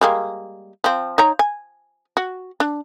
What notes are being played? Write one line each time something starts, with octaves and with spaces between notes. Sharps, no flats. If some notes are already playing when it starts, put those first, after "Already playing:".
G3 G#3 A#3
F3 C4
D#4 C#5 A#5
G#5
F#4
D4